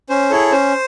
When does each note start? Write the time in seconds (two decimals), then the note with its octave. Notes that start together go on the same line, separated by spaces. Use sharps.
0.10 C#4 C5
0.30 E4 G#4 A4 C#5
0.51 C#4 C5